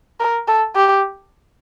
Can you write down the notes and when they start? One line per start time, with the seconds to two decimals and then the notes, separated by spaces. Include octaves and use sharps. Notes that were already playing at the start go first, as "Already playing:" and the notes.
0.20 A#4
0.48 A4
0.76 G4